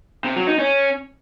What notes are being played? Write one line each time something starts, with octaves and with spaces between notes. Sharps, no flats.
C3
F#3
D#4
C#4